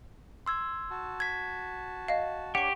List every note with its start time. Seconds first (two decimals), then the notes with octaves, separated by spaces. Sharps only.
0.46 C6 E6 G#6
0.91 F#4 A5
1.20 G#6 B6
2.08 D#5 F5
2.55 D4 G4 C#5 F#5 C#6